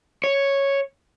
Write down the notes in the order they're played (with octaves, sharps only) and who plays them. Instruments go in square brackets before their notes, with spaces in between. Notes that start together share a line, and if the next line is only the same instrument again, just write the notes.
[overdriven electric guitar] C#5